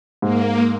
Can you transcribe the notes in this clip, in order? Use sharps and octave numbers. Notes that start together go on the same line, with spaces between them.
G#2 A#3